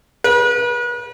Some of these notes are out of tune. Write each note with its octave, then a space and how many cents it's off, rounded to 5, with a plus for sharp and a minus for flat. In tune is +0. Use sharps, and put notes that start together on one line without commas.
B4 -35